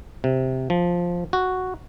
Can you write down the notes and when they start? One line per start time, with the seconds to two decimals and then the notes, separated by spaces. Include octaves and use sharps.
0.24 C3
0.70 F3
1.33 F#4